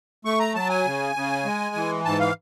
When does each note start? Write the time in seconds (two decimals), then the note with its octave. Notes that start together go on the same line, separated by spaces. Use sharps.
0.25 A3 C#6
0.40 A#5
0.55 F#3 A5
0.70 G#5
0.86 C#3
1.16 C#3
1.45 G#3
1.75 E3
2.05 G#2 A5
2.20 F5